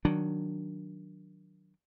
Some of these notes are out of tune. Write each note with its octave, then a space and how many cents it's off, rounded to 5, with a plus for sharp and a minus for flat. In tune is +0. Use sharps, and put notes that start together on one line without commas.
D#3 +0 F#3 +0 D4 +0